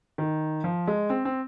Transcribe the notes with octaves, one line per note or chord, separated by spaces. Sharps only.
D#3
F3
G#3
C4
C4